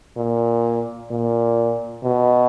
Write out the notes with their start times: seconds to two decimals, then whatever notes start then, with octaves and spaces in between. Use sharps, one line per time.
0.17 A#2
1.11 A#2
2.03 B2